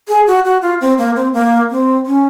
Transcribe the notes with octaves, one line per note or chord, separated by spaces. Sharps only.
G#4
F#4
F#4
F4
C4
A#3
C4
A#3
C4
C#4